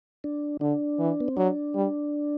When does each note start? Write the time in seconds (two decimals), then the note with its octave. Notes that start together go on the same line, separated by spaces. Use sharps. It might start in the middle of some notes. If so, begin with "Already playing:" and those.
0.24 D4
0.61 D3 D4
0.99 E3
1.20 B3
1.28 C4
1.37 F#3 D4
1.75 G3